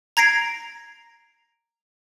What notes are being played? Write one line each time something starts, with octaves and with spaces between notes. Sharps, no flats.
A#5 G#6 A#6 C7 D7